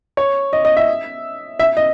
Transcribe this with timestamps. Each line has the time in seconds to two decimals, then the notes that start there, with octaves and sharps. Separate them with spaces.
0.17 C#5
0.53 D#5
0.65 D#5
0.77 E5
1.59 E5
1.77 D#5